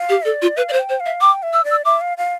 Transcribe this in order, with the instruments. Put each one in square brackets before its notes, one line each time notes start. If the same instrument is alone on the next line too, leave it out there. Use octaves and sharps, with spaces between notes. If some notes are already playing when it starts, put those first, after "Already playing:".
Already playing: [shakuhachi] F5
[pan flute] G4
[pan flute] A4 [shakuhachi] D5
[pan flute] F4
[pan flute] B4 [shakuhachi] F5
[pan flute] D5
C5
[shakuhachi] G5
[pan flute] C5
[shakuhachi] F5
[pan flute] E5
[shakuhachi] G5 [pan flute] D6
[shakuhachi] E5
[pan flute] E6
[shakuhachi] D5
[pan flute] E6
[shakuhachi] E5 [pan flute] D6
[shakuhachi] F5
F5